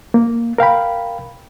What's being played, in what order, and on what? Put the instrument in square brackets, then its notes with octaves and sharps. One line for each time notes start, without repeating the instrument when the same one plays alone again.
[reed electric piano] A#3
A#4 F5 G5 B5